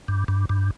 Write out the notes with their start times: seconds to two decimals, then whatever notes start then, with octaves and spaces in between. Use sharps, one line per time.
0.08 G2
0.28 G2
0.49 G2